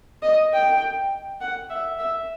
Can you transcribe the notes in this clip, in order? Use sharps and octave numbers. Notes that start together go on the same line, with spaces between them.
D#5
G5
F#5
E5
E5